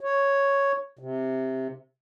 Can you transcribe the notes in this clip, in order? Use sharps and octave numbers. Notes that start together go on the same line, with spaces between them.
C#5
C3